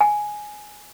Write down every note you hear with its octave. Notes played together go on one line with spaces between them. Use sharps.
G#5